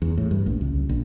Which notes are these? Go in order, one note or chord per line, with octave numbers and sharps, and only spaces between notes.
E2
A2
G2
A#1
C#2
A#1